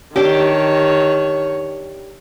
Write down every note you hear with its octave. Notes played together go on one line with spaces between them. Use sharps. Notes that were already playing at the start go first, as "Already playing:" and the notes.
D#3 D4 G4 C#5